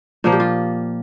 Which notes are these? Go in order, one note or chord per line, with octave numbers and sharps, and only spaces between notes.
A#2 F3 A#3 F4
G4
F4